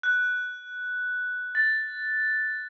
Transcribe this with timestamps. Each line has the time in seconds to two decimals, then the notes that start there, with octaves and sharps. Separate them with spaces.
0.03 F#6
1.55 A6